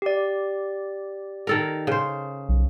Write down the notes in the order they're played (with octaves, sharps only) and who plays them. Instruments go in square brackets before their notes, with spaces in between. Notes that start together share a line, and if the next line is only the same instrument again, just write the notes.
[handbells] G4 D5
[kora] D#3 A4 A#4
C#3 C5
[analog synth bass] B1